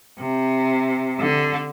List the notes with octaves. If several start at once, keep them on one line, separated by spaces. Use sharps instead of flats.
C3
D3